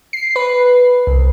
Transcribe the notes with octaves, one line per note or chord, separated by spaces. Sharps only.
C7
B4
C2